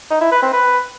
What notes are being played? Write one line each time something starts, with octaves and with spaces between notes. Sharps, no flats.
D#4
E4
B4
C4
B4